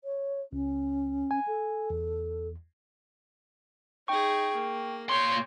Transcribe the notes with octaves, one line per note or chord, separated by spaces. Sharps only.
C#5
C#2 C#4
G#5
A4
E2
D#4 G#4 G5 C#6
A#3
A#2 C#5 G5 C6